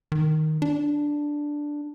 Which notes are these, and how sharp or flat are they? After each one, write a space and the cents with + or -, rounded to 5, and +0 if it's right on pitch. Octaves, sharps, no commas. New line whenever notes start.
D#3 +0
D4 +0